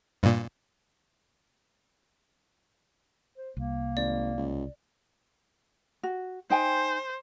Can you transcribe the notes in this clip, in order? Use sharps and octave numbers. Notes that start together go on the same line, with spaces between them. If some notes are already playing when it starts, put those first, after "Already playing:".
G2 A#2
C5
C2 A#3
G#1 D5
C#2
F#4
D#4 C5 G5 G#5